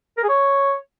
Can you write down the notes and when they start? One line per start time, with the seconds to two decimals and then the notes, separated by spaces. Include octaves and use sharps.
0.17 A#4
0.23 G#4
0.29 C#5